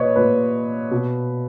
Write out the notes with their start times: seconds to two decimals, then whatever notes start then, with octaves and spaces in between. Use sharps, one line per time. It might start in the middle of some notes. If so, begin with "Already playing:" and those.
Already playing: A#2 B4 C#5 D#5
0.16 A#2 B4
0.91 B2